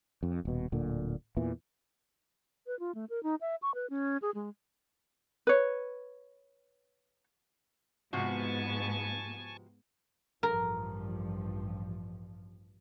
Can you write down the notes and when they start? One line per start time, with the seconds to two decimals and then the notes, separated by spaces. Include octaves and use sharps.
0.23 F2
0.45 D#1 B2
0.72 D1 A#2 D3
1.37 E2 A#2 E3
2.67 B4
2.79 F4
2.95 A3
3.10 A#4
3.23 D#4
3.41 E5
3.62 C#6
3.75 B4
3.90 C#4
4.22 G#4
4.35 G#3
5.47 B4 C#5
8.13 G#2 C3 F3 B3 F#4 G#5 A5 C#6
10.43 A1 G2 F3 A#4